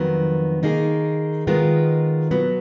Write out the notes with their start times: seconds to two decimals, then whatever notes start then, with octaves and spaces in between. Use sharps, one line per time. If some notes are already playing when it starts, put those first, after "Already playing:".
Already playing: F2 D#3 F#3 B3
0.63 D#3 A#3 D#4 G#4
1.47 D#3 G#3 B3 F4 A#4
2.31 B2 F#3 B3